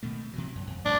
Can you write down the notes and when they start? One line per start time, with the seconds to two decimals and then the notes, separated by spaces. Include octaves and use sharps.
0.03 B2 D#3 A3
0.33 C3 E3 F#3
0.55 F#2
0.67 F2
0.85 G#2 G3 A3 D4